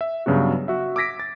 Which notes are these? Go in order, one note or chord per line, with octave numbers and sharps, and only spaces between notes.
E5
G2 C#3 F#3 B3 F#4
F#4 E5
D6 E6 G#6 A#6 B6 D7
A6